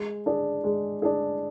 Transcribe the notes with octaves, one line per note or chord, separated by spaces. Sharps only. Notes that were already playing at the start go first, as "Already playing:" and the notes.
Already playing: G#3
D4 G#4
G#3
D4 G#4